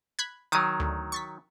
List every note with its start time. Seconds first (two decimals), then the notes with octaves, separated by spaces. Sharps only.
0.19 B5 F#6 G#6
0.52 D#3 F#3 D6 D#6 D#7
0.80 D2
1.12 C#6 A6 B6